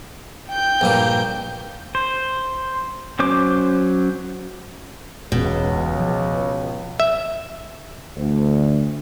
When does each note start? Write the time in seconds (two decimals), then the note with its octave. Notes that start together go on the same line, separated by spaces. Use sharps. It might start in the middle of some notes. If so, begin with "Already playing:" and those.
0.49 G5 G6
0.81 A#1 G2 A#3
1.95 C5
3.19 F#3 C#4 C5 D6
5.32 E1 C#2 B2
6.00 F3
7.00 E5
8.16 D2